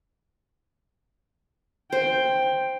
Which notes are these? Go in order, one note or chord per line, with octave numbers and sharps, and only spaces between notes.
C5 G5